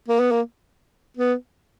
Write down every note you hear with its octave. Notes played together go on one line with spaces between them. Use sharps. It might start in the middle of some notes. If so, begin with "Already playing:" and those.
A#3
B3
A#3
B3